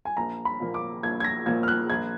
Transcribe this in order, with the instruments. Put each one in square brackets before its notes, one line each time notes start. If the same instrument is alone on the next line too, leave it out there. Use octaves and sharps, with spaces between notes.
[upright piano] G#5
[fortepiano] A#1 [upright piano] A#5
[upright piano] B5
[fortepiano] A#2 F3 A#3
[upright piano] D6
[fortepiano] A#1 [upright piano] G#6
[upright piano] G#6
A#6
[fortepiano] A#2 F3 A#3 [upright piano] G#6
[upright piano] F6
F#6
[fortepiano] A#1 [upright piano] G#6